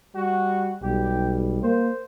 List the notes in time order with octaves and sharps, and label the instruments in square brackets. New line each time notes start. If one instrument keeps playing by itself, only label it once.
[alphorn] G3 [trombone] F#4
[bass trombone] B1 [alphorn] G3 [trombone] G4
[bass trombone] A#3 [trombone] C5